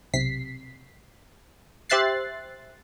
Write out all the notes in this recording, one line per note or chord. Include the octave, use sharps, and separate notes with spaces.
B1 C3 B6 C7
G4 C5 E5 F#6 A6 C7